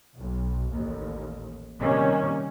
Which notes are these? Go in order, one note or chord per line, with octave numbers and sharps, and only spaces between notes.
B1
A1 D#2
C3 D#3 G3 A#3 C#4